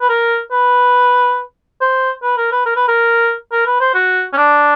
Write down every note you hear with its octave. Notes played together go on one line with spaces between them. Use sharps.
B4
A#4
B4
C5
B4
A#4
B4
A#4
B4
A#4
A#4
B4
C5
F#4
C#4
D4